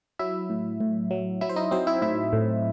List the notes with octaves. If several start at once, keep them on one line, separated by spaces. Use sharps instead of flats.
F#3 E4 E5
A2
A2
F#3
F#3 E4 E5
C5
D#4 D#5
F#3 C4 C5
E4 E5
A2 E4 E5
A2